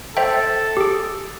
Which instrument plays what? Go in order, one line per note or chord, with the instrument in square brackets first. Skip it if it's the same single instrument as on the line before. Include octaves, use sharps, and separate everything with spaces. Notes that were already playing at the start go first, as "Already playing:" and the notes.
[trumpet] A4 [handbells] C5 E5 G5
[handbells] G4 G#4